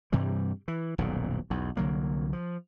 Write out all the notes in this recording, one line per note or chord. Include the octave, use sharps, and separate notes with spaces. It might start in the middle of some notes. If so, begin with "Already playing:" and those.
G2 C3 E3 G3
E3
D#1 B1 F#2 A#2
B1 E2
C2 D3 F#3 A#3
F3